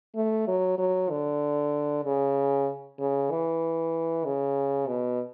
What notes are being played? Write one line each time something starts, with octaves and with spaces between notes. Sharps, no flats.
A3
F#3
F#3
D3
C#3
C#3
E3
C#3
B2